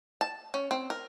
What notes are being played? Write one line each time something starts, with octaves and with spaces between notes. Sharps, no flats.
A5
C#4
C4
A#4